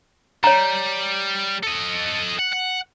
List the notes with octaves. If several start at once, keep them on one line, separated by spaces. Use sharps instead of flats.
G3 C#5 A#5
A4 D#5
F#5
F#5